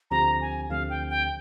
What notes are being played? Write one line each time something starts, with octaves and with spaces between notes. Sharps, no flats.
D2 D3 F3 C4 G4 A#5
G#5
D2 D3 F3 C4 G4 F5
G5
G5